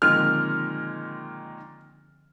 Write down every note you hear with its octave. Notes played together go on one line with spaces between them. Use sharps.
A#2 D3 D#3 F3 G#3 C4 F6